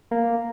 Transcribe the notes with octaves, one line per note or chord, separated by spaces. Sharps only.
A#3